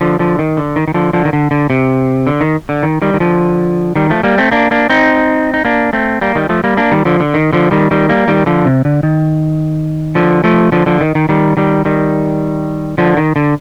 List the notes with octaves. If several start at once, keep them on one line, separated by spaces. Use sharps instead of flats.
D3 F3
D3 F3
D#3
D3
D#3
D#3
D3 F3
D3 F3
D#3
D3
D3
C3
D3
D#3
D3
D#3
D#3 G3
D#3
D3 F3
D#3 G3
F3 A3
G3 A#3
A3 C4
A#3 D4
A#3 D4
C4 D#4
D#4
A#3 D4
A3 C4
G3 A#3
D#3 G3
F3 A3
G3 A#3
A#3 D4
D#3 G3
D3 F3
D3
D#3
D3 F3
D#3 G3
D#3 G3
G3 A#3
D#3 G3
D3 F3
C3
D3
D#3
D3 F3
F3 A3
D3 F3
D3 F3
D#3
D#3
D#3 G3
D#3 G3
D#3 G3
D3 F3
D#3
D3